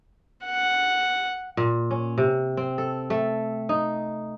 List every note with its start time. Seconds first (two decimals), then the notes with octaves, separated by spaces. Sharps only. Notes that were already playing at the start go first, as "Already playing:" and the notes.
0.45 F#5
1.57 A#2
1.91 C#4
2.18 C3
2.57 C4
2.78 A4
3.10 A3
3.69 D#4